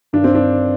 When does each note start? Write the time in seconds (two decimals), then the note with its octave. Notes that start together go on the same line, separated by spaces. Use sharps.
0.13 G2 D#3 D4
0.24 C4
0.35 D4